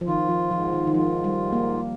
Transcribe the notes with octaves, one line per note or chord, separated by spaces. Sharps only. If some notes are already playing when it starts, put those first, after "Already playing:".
F3
D#3 F4
F3
G#2 F3
D#3
D#3
F3 F4
G3
G#2
A#3